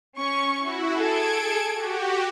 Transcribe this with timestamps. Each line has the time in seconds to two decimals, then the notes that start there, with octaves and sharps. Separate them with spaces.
0.18 C#4 C#6
0.58 E4 F#4
0.95 G#4 A4 G#6 D7
1.74 F#4 G4